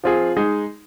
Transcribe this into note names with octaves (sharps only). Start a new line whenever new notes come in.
F3 C4 F4 G#4
G#3 D#4 G#4